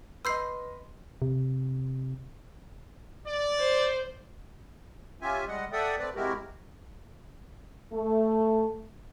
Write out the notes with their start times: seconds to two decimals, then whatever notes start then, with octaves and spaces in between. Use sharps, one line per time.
0.25 B4 D#5 B5 C6 E6 G6 C7
1.22 C3
3.27 D5
3.59 C5
5.22 C#4 F4 G4 E5 G#5
5.48 G3 G#3 D#5 F#5
5.72 A4 D5 E5 F#5 G5 D#6
5.99 A3 C4 B4 D5
6.15 C3 G#3 E4 F#4 G4 A#4
7.93 A3